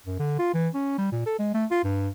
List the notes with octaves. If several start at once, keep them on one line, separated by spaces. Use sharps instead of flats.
F#2
D3
F4
E3
C#4
G3
A#2
A4
G#3
A3
F4
G2